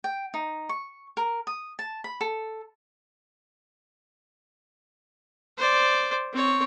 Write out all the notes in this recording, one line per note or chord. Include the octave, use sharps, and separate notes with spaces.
G5
D#4
C#6
A#4
D#6
A5
B5
A4
C5 D5
C4 C#5